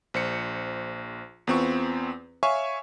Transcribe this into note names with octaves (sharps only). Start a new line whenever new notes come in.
A#1 C5 C#7
E2 B3 C4 F4 C#6
C#5 E5 F5 G#5 C#6